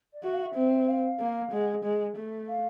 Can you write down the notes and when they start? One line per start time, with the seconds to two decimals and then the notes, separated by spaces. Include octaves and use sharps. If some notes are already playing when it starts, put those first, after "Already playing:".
0.13 D5
0.23 F#4 E5
0.33 F5
0.42 E5
0.55 C4
0.88 F5
1.19 A#3
1.51 G#3 F#5
1.84 G#3
2.16 A3
2.48 F5